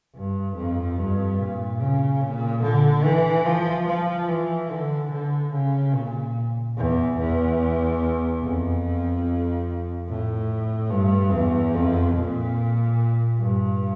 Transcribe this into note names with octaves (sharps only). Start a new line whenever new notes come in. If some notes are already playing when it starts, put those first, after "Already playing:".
G2
F2
G2
A#2
C#3
A#2
D3
E3
F3
F3
E3
D3
D3
C#3
A#2
E2
E2
F2
A2
G2
E2
F2
A#2
G2